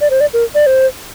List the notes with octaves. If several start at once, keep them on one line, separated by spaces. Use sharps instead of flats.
D5
C5
D5
A#4
D5
C5